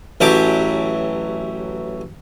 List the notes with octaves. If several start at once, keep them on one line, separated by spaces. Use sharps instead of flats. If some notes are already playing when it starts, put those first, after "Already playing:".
A1 E3 F#3 G4 A5 D6